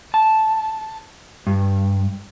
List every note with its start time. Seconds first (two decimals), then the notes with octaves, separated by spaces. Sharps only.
0.14 A5
1.47 G2